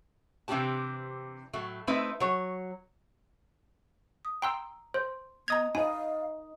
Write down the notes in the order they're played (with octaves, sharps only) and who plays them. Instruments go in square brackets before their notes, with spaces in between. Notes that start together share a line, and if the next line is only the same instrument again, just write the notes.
[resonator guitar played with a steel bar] C3 E3 C4 D4 G4 A5
A2 F#3 A3
A3 C4 D#4 E4 B4 E5
F#3 C#5
[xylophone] D#6
[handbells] G5 C6 E6 [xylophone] A#5
[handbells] C5 [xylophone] C6
[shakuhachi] B3 [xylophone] D#5 A#6 F7 [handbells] A#5 D#6 G#6
[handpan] D#4 D#5 [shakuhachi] F5 [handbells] G#5 [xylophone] B5